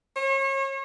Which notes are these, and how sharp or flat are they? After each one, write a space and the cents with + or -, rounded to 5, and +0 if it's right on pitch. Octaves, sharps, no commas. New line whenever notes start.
C#5 -35